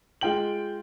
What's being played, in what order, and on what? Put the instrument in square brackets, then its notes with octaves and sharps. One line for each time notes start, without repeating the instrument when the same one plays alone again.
[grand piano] G#3 F4 G5 F#7